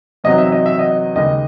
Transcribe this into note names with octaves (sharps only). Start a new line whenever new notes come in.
E2 C3 F#3 C4 D#4 D#5
E5
D#5
E5
D#5
D#2 C#3 G#3 D#5